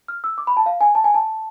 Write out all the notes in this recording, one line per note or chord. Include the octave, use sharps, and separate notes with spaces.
F6
E6
D6
B5
A5
F5
G#5
A5
G#5
A5